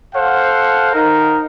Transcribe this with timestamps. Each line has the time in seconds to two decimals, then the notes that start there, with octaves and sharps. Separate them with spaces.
0.14 A4 C5 F5 F#5
0.93 D#4 A#4